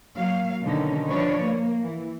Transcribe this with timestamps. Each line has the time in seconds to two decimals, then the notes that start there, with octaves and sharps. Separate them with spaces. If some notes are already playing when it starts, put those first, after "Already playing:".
0.16 F#3 A#3 F5
0.62 B2 D3 D#3 C#4 D#4
1.08 F3 D4 B4 C#5 D5
1.43 A#3
1.82 E3